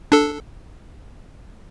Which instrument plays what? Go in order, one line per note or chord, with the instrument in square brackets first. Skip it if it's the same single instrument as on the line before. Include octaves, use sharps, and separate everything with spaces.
[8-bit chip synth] D4 A4